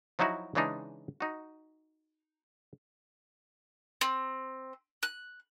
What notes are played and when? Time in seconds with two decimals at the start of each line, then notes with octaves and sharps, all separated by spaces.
0.19 F3 F#3 D#4 E4 F#4
0.55 C#3 E3 G#3 D4 D#4
1.20 D#4 F#4
4.01 C4
5.03 F#6